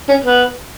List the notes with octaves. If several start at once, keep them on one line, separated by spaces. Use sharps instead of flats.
C#4
B3